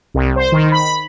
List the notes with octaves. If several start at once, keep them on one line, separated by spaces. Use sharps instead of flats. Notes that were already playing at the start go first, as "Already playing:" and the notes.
C2
C5
D#3
B5